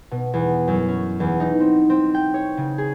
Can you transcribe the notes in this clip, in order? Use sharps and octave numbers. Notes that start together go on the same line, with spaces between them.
B2
E2
F#2
C#4
E2
D#4
C4
C4
G5
C#5
C#3
G#4